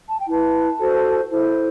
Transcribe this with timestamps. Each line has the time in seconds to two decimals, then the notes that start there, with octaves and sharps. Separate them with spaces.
0.09 A5
0.19 G5
0.26 E4 B4 A5
0.78 F#4 A4 C5
1.30 E4 A4 C5